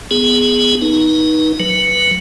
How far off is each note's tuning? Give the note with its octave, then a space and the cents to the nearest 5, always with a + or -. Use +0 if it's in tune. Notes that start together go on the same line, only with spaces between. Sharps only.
B3 +0 G#4 +0
D#4 +10 B4 -40
F#3 +0 B4 +0